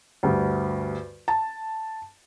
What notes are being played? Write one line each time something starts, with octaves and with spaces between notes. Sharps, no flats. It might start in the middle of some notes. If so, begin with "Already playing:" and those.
D2 G2
A5